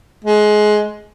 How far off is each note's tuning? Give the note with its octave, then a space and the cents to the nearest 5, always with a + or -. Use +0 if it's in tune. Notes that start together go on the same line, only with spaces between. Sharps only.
G#3 +20